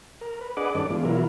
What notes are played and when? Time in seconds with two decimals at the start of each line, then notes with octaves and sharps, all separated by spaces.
0.21 A#4
0.41 B4
0.57 D4 G#4 B4 D#5 F#5 D6
0.75 G2 D#3 C#4 D4 A4 D6
0.90 E3 G#3 B3 D4 F4
1.05 B2 E3 F#3 E4 F4 A#4